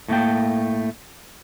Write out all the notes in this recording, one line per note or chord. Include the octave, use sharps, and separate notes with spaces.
A2 A3 A#3 G5